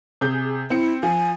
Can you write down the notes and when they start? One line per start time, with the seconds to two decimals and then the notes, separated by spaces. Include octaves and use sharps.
0.21 C3 G#4 G6
0.70 C4 E4 C#7
1.03 F3 G#5